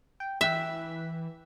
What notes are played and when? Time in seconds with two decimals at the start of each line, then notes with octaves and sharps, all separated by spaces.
0.20 G5
0.41 E3 E5 G5 F#6 B6